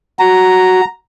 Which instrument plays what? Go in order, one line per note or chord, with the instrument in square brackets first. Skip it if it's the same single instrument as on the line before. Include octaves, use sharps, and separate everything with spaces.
[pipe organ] F#4 [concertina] A#5